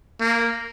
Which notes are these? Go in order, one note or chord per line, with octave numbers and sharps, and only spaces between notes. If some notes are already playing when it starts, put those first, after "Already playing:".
A#3